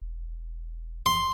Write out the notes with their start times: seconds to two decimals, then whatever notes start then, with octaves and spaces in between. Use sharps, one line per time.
0.01 E1
1.06 C6